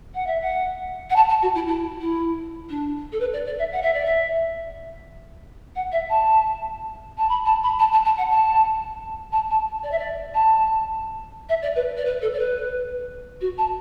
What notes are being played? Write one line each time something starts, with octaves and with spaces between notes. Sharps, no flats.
F#5
E5
F#5
F#5
A5
A5
F#4
E4
E4
E4
D4
A4
B4
D5
D5
E5
F#5
E5
D5
E5
F#5
E5
A5
A5
B5
A5
B5
A5
A5
A5
F#5
A5
A5
A5
D5
E5
D5
A5
E5
D5
B4
D5
B4
A4
D5
B4
F#4
A5